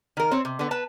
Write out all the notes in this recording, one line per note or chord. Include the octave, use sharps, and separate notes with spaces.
D#3 A#4
C4 C#5
C3
D3 B3
B4 A5